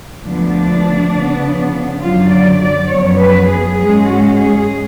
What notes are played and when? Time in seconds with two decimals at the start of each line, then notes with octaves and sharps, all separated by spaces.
0.25 D2 D3 F3 B3 D4
1.13 C#3 F3 B3
2.01 F#2 D3 F#3 F4
2.32 D5
2.61 D5
2.90 F#2 F3 B3 C#5
3.20 B4
3.49 G#4
3.79 G#2 G#3 C#4 G#4
4.08 F#4
4.38 G#4